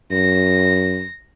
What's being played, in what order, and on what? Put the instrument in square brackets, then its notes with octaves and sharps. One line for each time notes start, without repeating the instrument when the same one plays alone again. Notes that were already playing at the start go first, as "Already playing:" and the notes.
[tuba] F#2 [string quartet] A#6